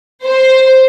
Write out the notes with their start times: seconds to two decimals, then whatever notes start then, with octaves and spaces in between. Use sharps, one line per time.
0.24 C5